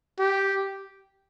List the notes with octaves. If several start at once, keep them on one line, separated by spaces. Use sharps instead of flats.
G4